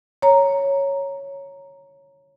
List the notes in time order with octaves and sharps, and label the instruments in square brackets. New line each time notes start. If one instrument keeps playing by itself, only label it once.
[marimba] C#5 A#5